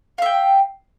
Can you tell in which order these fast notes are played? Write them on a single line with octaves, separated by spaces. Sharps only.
F5 E5 G5